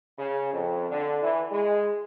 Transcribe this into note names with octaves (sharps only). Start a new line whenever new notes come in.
C#3
F2
D3
E3
G#3